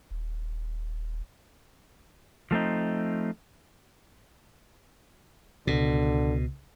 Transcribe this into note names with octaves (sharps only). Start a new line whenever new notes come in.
D#1
F3 A3 C4 D#4
C#2 B2 D3